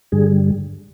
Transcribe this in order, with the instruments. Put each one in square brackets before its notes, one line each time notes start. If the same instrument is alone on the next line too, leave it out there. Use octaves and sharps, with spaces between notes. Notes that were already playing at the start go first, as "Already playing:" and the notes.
[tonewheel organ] G2 D3 G3 G#4